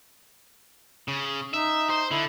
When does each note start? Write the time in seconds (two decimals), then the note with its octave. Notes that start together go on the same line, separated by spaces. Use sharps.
1.08 C#3
1.54 D#4 E5
1.90 C5
2.11 D3 E4